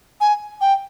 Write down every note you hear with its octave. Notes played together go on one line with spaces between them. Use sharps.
G#5
G5